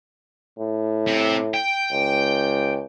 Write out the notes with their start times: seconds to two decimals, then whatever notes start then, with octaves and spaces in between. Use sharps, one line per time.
0.59 A2
1.07 C3
1.54 G5
1.92 C#2